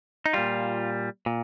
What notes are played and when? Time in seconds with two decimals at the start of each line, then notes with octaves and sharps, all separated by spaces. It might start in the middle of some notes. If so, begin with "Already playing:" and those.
0.26 D#4
0.33 A#2 G3 F4
1.26 A#2